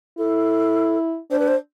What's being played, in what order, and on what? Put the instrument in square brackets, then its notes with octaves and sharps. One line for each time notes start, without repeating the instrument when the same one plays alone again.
[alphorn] E4 [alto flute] A4
[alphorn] D4 [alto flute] C5
[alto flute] B4
C5